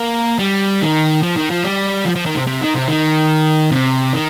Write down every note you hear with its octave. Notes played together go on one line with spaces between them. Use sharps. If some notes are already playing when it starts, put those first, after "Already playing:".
Already playing: A#3
G3
D#3
F3
D#3
F3
G3
F3
F3
D#3
C3
C3
D#3
C3
D#3
C3
D#3